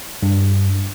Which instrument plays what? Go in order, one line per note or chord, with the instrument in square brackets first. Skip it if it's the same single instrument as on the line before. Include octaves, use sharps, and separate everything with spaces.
[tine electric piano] G2